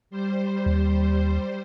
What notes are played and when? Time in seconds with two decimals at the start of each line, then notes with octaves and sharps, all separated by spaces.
0.10 G3 C5
0.66 D#2